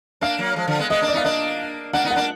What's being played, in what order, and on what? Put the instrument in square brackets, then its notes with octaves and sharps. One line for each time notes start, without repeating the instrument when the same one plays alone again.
[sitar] A#3 D4 [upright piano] F5
[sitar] F#3 A#3
F3 G#3
D3 F3
G#3 B3
[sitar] G#3 B3 [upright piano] D#5
[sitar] A#3 D4
[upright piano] D5
[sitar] B3 D#4 [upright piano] F5
[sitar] A#3 D4 [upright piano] D#5
[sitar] A#3 D4 [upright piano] F#5
[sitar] B3 D#4
[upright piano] F#5
[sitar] A#3 D4